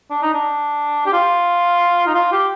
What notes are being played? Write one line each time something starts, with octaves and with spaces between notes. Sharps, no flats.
D4
D#4
D4
G4
F4
D#4
F4
G4